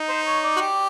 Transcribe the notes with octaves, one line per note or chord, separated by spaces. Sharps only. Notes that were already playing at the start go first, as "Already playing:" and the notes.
Already playing: D#4
C5
C#5
D5
F#4
G4